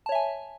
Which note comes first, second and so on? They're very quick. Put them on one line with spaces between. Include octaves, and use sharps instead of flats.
A5 C#5 E5 G#5